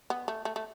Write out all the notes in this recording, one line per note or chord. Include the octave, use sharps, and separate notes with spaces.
B3
A3
A3
A3